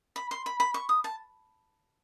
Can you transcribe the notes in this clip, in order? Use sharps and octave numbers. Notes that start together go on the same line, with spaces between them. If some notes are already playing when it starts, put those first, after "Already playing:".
B5
C6
B5
B5
C#6
D#6
A5